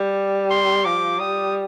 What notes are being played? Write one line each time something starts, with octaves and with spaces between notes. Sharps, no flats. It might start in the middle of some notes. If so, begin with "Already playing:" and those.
Already playing: G3
C6
F3 D6
G3 D#6